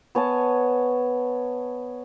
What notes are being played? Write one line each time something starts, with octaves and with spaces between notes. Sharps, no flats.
B3 C#5 G#5 A5